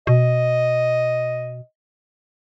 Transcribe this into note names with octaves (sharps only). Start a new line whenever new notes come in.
B2 D#5